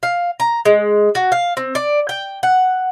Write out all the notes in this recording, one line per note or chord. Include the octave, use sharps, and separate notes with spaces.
F5
A#5
G#3
F#4
F5
C4
D5
G5
F#5